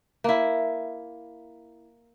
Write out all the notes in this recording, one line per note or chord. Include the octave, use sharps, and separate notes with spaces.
A#3 E4